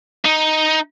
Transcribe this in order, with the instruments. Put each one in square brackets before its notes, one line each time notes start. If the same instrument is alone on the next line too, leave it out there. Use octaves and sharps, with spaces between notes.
[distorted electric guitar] D#4